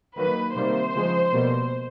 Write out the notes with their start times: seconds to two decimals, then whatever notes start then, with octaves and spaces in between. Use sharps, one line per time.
0.16 D#3 F#3 A#3 B4
0.56 C3 D#3 G3 A#3 C5
0.95 C#3 F3 G#3
1.33 B2 G3 A#3